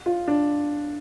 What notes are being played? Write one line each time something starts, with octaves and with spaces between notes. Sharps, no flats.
F4
D4